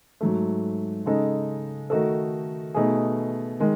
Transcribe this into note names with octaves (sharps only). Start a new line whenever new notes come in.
G#2 F#3 A3
C#3 G#3 D#4 A4
D#3 A3 D#4 F#4 A4
B2 A3 D#4 G#4
D#3 G#3